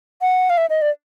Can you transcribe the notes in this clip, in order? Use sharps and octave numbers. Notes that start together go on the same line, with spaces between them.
F#5
F5
E5
D#5
D5